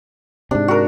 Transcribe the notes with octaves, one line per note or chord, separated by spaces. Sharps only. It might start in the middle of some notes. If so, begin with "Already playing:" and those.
G#2 C3 D4
F#4 A#4